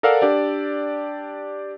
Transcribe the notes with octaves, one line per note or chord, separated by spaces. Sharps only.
A4 A#4 D5 F5 F#5 E6
D4 G4 D5